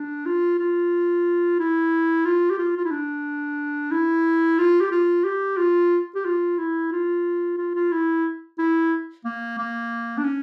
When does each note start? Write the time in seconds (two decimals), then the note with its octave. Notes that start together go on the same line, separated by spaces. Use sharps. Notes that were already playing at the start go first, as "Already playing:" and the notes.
Already playing: D4
0.26 F4
0.59 F4
1.59 E4
2.25 F4
2.50 G4
2.58 F4
2.77 F4
2.85 E4
2.91 D4
3.92 E4
4.59 F4
4.81 G4
4.91 F4
5.24 G4
5.58 F4
6.15 G4
6.25 F4
6.58 E4
6.92 F4
7.58 F4
7.75 F4
7.92 E4
8.58 E4
9.25 A#3
9.58 A#3
10.18 D4
10.24 C#4